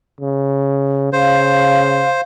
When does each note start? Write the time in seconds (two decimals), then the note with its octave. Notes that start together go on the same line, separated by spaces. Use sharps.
0.21 C#3
1.13 C#3 C5 F5